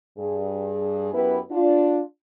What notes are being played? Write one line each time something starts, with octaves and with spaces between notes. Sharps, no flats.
G2 G#4
F#2 B3 E4 G4 B4
D4 F4